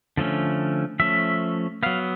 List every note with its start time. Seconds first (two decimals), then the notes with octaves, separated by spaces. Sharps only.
0.17 D3 F3 A3 C#4
1.00 F3 A3 C#4 E5
1.83 F#3 B3 F5